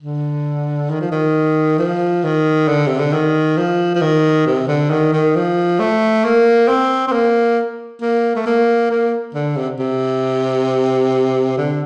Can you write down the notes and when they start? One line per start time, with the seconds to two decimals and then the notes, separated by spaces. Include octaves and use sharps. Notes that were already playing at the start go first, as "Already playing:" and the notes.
0.01 D3
0.90 D#3
1.01 F3
1.12 D#3
1.79 F3
2.24 D#3
2.68 D3
2.87 C3
2.99 D3
3.13 D#3
3.57 F3
3.95 F3
4.01 D#3
4.46 C3
4.68 D3
4.91 D#3
5.13 D#3
5.35 F3
5.79 A3
6.24 A#3
6.68 C4
7.08 C4
7.12 A#3
8.02 A#3
8.36 A3
8.46 A#3
8.91 A#3
9.34 D3
9.56 C3
9.79 C3
11.57 D3